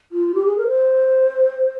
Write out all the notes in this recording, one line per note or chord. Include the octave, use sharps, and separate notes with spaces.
F4
G4
G#4
A#4
C5